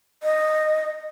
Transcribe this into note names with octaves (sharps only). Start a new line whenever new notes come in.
D#5